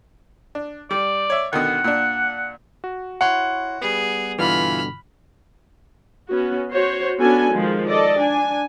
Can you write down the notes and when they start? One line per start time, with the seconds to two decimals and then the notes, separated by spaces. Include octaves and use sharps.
0.55 D4
0.91 G3 D5
1.30 C#5 E5
1.53 B2 D3 D#3 F#5
1.84 A#2 D4
2.84 F#4
3.21 E4 C#5 F#5 C6
3.81 G3 B3 G#4
4.38 G2 B2 D3 E3 F4 B5 F6
6.29 B3 C#4 F#4
6.72 F#4 C5 C#5
7.19 B3 C#4 D4 F#4 A4 G#5
7.53 D#3 F3 G#3
7.87 A4 D5 D#5
8.20 D4 G#5